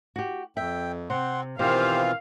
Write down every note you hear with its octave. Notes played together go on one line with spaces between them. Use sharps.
F#4 G4
F2 E5 G5
C3 C4 F#5 C6
B2 D#3 E3 C4 F4 G4 C5 F5